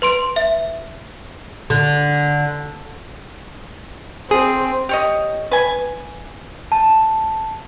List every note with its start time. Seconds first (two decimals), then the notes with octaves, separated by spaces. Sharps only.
0.02 B4 C6 D7
0.36 E5
1.70 D3
4.31 C4 G#4
4.89 G4 C#5 D#5
5.51 B4 G#5
6.72 A5